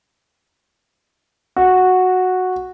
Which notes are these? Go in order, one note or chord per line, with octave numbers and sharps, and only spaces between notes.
F#4